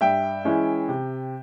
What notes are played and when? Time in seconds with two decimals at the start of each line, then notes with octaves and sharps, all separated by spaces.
0.01 G2 E5 G5
0.45 E3 G#3 C#4 E4
0.89 C3